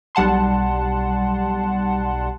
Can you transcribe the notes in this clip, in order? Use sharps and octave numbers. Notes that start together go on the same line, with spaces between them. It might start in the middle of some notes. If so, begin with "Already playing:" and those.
B1 G3 F#5 A5 C6